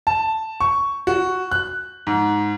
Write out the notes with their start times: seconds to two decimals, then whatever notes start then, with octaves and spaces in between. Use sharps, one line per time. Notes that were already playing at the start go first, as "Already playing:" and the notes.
0.07 A5
0.60 C#6
1.07 F#4
1.52 F#6
2.07 G#2